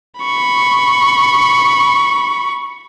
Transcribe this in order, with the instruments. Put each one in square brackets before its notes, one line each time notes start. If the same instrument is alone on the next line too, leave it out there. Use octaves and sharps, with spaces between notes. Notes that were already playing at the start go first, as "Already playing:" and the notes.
[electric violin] B5 C#6